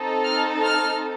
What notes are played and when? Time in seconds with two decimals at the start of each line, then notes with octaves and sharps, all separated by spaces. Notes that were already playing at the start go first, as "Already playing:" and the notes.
Already playing: C4 D#4 A4
0.25 F6
0.61 F6